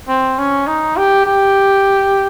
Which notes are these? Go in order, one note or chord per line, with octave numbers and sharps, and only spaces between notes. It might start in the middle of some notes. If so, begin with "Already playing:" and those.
C4
C#4
D#4
G4
G4